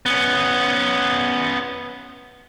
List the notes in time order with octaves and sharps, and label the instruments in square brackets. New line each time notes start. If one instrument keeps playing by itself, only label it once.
[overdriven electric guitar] B3 C#4